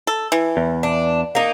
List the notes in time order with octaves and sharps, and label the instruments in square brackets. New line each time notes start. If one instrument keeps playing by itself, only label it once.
[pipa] A4
E3
[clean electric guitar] E2
[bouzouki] D4
A#3 D#4